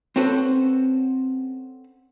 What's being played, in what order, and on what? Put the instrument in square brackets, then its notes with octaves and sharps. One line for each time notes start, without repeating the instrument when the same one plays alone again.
[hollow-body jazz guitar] C4 C#4 F#4 A4 B4 C5